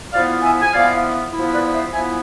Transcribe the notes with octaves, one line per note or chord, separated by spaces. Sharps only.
F3 B3 E4 D5 F5
E5 G#5
G#5
F3 B3 E4 D5 F5
F3 B3 E4
B4 D5
C5 E5
F3 B3 E4 E5 G#5